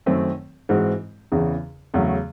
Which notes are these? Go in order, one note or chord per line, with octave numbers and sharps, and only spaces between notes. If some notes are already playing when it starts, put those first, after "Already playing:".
F#2 D#3 A3 C4
G#2 E3 G#3 C4 F#4
E2 C#3 E3
E2 C#3 F#3 A3 C#4